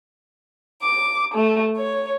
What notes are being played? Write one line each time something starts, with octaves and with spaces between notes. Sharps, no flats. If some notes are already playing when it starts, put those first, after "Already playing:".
D6
A3
C#5